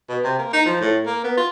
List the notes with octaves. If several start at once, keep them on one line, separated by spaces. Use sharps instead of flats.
B2
C3
A#3
D#4
F3
A2
A#3
B3
F4